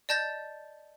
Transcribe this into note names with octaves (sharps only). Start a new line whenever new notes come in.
D5 D#5 A5 G6 A6 A#6